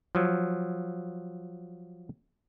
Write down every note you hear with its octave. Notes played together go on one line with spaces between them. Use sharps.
F3 F#3